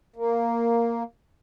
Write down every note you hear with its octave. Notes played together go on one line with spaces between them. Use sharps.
A#3